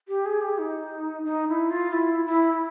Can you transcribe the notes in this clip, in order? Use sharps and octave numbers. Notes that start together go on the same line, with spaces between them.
G4
G#4
G4
D#4
D#4
E4
F4
E4
E4